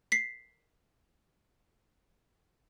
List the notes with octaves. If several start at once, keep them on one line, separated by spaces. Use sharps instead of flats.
B6 C7